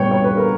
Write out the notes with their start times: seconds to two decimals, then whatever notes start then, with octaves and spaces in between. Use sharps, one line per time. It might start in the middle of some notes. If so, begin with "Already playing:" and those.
Already playing: A#2 G3 B3 C#5 G5
0.12 C#5
0.24 B4
0.37 A#4